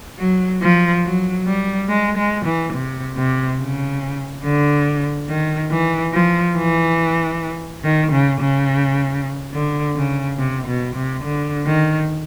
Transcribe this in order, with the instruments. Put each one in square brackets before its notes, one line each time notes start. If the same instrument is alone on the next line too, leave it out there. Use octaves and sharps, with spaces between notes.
[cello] F#3
F3
F#3
G3
G#3
G#3
E3
C3
C3
C#3
D3
D#3
E3
F3
E3
D#3
C#3
C#3
D3
C#3
C3
B2
C3
D3
D#3